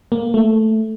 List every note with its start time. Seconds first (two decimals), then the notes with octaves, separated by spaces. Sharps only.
0.12 A#3
0.34 A3